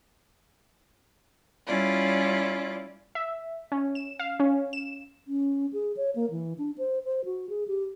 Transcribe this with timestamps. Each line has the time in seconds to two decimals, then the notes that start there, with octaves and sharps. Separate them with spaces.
1.66 G3 C#4 E4 F4 D5
3.15 E5
3.72 C#4
3.95 E7
4.19 F5
4.40 C#4
4.73 E7
5.27 C#4
5.73 G#4
5.97 C#5
6.16 A#3
6.31 E3
6.58 D4
6.78 C5
7.04 C5
7.25 F#4
7.49 G#4
7.68 G4